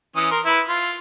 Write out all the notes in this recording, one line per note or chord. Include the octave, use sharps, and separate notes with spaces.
E3 C#4 D#6
A#4 C6
E4 B4
F4